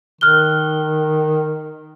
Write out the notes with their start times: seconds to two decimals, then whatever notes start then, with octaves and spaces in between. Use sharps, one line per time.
0.21 D#3 F6 F#6 G7